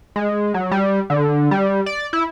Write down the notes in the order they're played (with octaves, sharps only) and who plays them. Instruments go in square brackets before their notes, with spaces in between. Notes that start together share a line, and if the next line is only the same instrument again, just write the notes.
[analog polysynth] G#3
F#3
G3
D3
G3
D5
E4